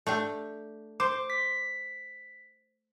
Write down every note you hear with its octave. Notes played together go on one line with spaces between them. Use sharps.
A3 D4 G4
C5 C6 D6
B6